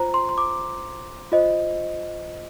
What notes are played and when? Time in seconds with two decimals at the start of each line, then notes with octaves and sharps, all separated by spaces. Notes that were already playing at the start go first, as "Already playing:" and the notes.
Already playing: F4 C5 A#5
0.14 C6
0.29 C6
0.38 D6
1.32 F4 C5 D#5